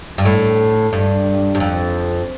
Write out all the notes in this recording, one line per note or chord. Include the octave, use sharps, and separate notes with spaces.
G2
A2
G2
G2
F2